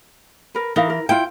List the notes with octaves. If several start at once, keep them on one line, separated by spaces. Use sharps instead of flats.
A#4 B4
E3 D#4 A#4 F5
A#4
E4 F4 G5